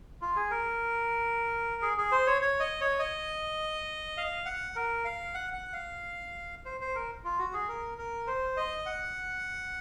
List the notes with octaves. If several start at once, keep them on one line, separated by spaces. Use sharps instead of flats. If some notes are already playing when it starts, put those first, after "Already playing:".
F4
G#4
A#4
G#4
G#4
C5
C#5
C#5
D#5
C#5
D#5
F5
F#5
A#4
F5
F#5
F#5
F5
C5
C5
A#4
F4
F#4
G#4
A#4
A#4
C5
D#5
F#5